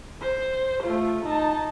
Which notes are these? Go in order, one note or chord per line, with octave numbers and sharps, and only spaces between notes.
C5
A3 F4
D#4 A5